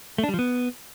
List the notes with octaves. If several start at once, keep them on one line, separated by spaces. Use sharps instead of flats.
A3
D4
G3
F3
B3